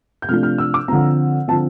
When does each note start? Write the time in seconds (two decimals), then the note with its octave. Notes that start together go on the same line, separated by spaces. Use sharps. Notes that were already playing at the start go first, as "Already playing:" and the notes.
0.22 G6
0.29 C3 F3 A3 D4 F6
0.43 F6
0.58 E6
0.74 D6
0.88 D3 F3 C4 A#5
1.48 D3 F3 C4 A5